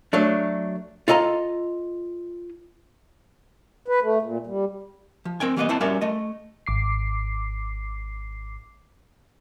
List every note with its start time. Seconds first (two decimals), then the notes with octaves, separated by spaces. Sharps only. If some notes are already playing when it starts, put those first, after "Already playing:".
0.13 F#3 A3 D4
1.08 F4 A4 D#5 G#5 A#5
3.88 B4
4.02 A3
4.22 A#2
4.47 G3
5.25 F3
5.40 C4 A#4 G5 G#5
5.57 E3 G3 A#3 B3 B4 D#5
5.69 C4 E4 C5 F#5 A5
5.80 G3 C#4 F#4 A#4 D5 E5
6.01 A3 D#5
6.66 G#1 D6 C7